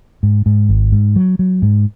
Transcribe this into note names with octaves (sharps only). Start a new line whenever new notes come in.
G#2
G#2
G#1
G#2
F#3
F#3
G#2